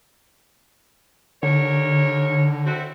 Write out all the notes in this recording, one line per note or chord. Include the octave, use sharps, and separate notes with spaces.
D#2 D3 A#4 C#5
C4 E4 F#4